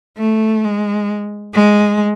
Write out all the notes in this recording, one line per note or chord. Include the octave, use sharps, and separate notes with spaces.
A3
G#3
G#3